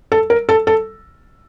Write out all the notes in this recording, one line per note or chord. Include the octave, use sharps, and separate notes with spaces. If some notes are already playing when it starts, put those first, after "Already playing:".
A4
A#4
A4
A4